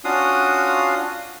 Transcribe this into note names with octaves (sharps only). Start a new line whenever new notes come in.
C#4 D4 F4 F#4 F5 D#6